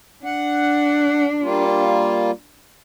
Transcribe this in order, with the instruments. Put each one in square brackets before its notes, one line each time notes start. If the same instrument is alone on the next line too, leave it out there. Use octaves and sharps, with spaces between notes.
[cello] D4 [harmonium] F#5
[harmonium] G3 A#3 F4